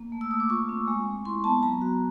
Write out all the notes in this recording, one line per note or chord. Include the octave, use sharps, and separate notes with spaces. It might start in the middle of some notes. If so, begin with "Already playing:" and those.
Already playing: A#3
A3
E6
A3 D#6
D6
F4 C#6
C4
G#3
G#3
E4 C6
B3 A5
F#3 A#5
F#4